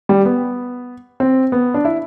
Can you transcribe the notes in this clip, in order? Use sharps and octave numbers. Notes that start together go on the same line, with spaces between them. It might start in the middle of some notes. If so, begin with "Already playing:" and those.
G3
B3
C4
B3
D4
E4